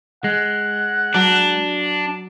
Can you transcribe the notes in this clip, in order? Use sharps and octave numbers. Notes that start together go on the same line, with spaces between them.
G#3 F#5
F#3 D4